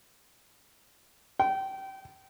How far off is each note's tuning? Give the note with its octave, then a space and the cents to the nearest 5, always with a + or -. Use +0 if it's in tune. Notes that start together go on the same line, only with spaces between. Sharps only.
G5 -25